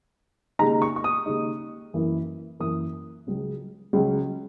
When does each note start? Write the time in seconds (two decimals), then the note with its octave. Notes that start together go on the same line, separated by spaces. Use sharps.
0.59 D#2 C#3 G#3 D#4 A#5
0.82 C#6
0.96 C#6
1.04 D#6
1.26 D#2 C#3 G#3 D#4
1.93 F#2 E3 A#3 E4
2.60 F#2 E3 A#3 E4 D#6
3.27 C#2 C#3 F#3 C#4
3.93 C#2 C#3 F#3 C#4